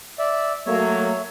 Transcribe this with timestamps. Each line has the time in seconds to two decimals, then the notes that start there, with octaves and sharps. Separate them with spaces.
0.19 D5 E5
0.66 F#3 A3 A#3 C#5 E5